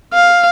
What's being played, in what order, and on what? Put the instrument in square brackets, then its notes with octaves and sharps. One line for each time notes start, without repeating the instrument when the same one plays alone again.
[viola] F5